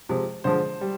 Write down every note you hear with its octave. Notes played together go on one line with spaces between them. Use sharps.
C3 F3 G#3
D3 F3 G#3 C5
G3